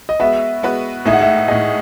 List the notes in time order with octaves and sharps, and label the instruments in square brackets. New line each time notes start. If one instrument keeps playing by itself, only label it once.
[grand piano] D#5
[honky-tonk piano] G#3 B3 F#4 B4 [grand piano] E5
[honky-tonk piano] G#3 B3 F#4 B4
[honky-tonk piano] A2 G#3 D#4 G#4 [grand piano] E5
[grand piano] F#5
E5
[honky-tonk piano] A2 G#3 D#4 G#4 [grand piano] D#5